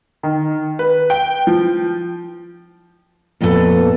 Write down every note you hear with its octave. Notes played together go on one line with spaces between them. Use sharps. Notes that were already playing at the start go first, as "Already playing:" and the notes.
D#3
B4
G5
F3
F2 A#2 B3 D#4 A4 B4